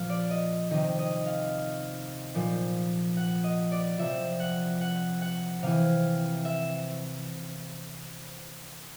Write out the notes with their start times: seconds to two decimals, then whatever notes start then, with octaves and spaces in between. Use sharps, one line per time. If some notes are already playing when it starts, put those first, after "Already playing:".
Already playing: A#2 F3 F5
0.10 D5
0.30 D#5
0.71 C3 D#3 D#5
0.99 D#5
1.26 F5
2.35 A#2 F3
3.17 F#5
3.44 D#5
3.72 D5
3.98 C3 F3 E5
4.40 F#5
4.81 F#5
5.22 F#5
5.63 C3 E3 F5
6.45 E5